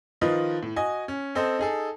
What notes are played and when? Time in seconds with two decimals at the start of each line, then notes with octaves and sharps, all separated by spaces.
0.21 D#3 F3 F4 B4 D#5
0.63 A2
0.76 F#4 D#5 G#5
1.08 C#4
1.35 C4 A4 C5 D#5
1.59 D#4 G#4 A4